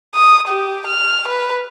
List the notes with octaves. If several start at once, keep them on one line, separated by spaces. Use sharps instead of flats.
D#6
G4
F6
B4